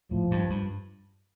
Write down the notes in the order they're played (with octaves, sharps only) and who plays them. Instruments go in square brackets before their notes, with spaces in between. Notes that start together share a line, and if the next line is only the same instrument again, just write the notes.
[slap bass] A2 [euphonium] F3
[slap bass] G2
G2